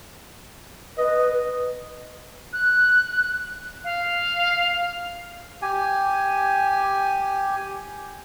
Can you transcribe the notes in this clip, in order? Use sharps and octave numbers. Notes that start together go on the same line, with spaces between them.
B4 D#5
F#6
F5
G4 G#5